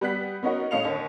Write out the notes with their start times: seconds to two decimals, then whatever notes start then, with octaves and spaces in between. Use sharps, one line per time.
0.01 G3 B3 F#6 B6
0.43 B3 C#4 D#4 F#4 A#4
0.71 A2 C#4 D#5 F5 C#7 F7
0.85 D#2 D3